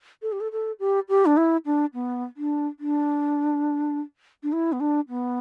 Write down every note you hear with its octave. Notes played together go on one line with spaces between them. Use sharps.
A4
G4
A4
A4
G4
G4
D4
E4
D4
B3
D4
D4
D4
E4
B3
D4
B3